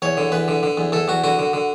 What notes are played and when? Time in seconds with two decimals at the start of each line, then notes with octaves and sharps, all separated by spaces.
0.02 E2 C#5
0.17 D3
0.32 E2 B4
0.48 D3
0.63 D3
0.77 E2
0.92 E2 A4
1.08 E2 F#4
1.24 D3 F#4
1.39 D3
1.53 D3